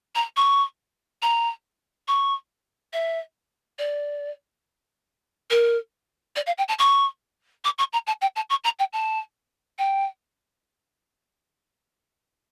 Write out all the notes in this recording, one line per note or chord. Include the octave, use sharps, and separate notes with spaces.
A#5
C#6
A#5
C#6
E5
D5
A#4
D5
F5
G5
A5
C#6
D6
C#6
A#5
A5
G5
A5
C#6
A#5
G5
A5
G5